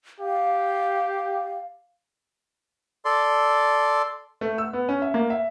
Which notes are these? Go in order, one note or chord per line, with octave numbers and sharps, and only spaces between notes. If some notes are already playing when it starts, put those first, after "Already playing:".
G4 F5
A4 D5 C6
A3
E6
B3
C#4
E5
A#3
E5